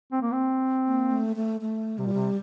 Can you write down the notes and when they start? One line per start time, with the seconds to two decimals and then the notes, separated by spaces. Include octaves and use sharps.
0.12 C4
0.22 A#3
0.32 C4
0.86 A#3
1.12 A3
1.36 A3
1.61 A3
1.98 C3 G3
2.06 A#2
2.13 C3